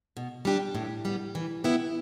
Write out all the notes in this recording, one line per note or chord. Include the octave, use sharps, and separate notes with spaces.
B2
G3 D4 G4
A2
G3 B3
E3
B3 E4 G4